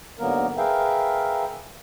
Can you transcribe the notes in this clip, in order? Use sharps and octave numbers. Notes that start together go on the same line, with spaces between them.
G#2 D3 F#3 A#3 B3 A#4
G#4 A#4 B4 E5 F5 G5